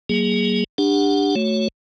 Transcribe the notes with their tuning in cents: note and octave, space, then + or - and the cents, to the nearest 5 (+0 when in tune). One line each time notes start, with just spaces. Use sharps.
F#3 +30 A#3 +0 G#4 -5
D4 +15 G4 +30 F#5 +0
A3 +0 F#4 +0 C#5 +0